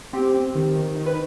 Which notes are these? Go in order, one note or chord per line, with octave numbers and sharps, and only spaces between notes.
C4 G4
C4
D#3
D#3
D#3
B4